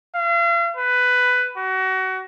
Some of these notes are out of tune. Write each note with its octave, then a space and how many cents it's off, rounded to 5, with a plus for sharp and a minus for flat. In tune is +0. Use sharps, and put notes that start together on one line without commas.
F5 -40
B4 +10
F#4 +30